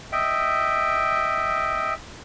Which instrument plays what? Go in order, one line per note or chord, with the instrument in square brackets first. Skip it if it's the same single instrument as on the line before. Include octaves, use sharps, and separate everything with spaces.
[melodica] D#5 E5 G5